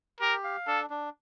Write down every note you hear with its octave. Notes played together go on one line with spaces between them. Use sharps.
G4 A#4
F5
D4 A4
D4